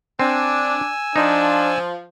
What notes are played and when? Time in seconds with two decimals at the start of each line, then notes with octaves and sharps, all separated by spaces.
0.19 C4 D4 G#5 E6
1.16 F3 D4 D#4